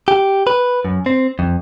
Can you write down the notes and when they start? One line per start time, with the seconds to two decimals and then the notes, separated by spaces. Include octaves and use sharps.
0.08 G4
0.47 B4
0.85 F#2
1.06 C4
1.39 F2